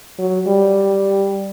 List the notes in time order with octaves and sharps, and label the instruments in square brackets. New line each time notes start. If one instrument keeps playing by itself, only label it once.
[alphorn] F#3
G3